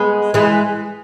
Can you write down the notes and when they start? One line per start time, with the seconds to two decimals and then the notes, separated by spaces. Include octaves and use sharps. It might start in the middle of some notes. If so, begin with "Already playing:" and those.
Already playing: G#3 B3
0.34 E3 G#3